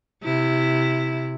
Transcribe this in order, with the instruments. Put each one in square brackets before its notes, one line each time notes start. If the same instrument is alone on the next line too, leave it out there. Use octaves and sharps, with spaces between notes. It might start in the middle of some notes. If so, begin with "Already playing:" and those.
[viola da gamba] C3 E4